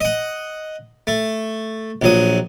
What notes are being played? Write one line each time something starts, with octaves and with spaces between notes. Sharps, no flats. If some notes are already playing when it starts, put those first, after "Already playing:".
D#5 F#5
A3
A#1 F#3 D#6